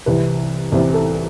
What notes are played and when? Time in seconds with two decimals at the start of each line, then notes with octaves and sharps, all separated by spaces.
0.06 C2 C3 E3 B4
0.72 C2 C3 E3 C5
0.94 A4